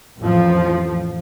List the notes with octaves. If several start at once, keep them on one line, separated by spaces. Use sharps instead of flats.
A1 F2 F3